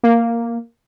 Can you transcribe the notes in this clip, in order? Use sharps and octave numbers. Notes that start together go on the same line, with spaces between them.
A#3